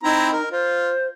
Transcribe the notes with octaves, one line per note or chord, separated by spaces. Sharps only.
C4 D#4 E4 A#5
A#4
F4 C5